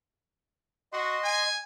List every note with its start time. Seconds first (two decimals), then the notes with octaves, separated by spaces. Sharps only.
0.93 F#4 D#5 C6
1.24 G#5